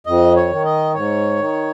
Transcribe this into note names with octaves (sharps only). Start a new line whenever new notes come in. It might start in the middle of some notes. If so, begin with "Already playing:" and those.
F2 D#5
C#5
D#3
D#5
G#2 C#5
D#3